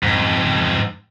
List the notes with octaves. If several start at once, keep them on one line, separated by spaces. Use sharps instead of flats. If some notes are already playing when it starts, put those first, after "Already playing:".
F2 G#2